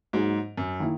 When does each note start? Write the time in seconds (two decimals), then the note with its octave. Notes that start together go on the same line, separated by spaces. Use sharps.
0.13 G#2 F#3 A#3 D#4 G#4
0.57 F#2
0.80 D#3 A#3 E4